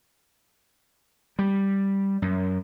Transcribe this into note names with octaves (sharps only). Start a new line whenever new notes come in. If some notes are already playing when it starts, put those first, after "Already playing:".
G3
F#2